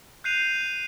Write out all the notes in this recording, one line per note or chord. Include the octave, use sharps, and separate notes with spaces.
F#6 G6 C7 D#7 F7